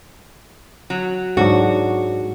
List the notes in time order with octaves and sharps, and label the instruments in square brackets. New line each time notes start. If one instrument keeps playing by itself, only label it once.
[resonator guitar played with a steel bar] F#3
[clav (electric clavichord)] G#2 F#3 D4 [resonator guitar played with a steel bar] F#4